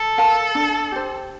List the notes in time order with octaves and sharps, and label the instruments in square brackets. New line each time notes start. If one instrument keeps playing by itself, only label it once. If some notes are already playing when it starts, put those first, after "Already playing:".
Already playing: [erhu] A4
[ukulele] A#4 F5 A5
D4
G4 C5